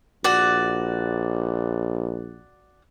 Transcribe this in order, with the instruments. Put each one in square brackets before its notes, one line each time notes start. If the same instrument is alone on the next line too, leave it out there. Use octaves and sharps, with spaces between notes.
[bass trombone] A#1 [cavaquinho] F#4 D5